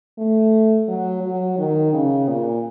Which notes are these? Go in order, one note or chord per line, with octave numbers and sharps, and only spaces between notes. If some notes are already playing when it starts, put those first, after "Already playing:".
A3
F#3
F#3
D#3
C#3
A#2